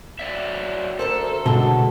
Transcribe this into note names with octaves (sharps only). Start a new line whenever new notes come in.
F#3 D5 E5
D2 A4 A#4 C5
B2 D3 G#3 B3 F#4 A5 G7